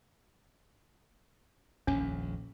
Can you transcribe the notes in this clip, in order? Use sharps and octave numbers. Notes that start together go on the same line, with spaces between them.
D#1 A#1 F2 C#4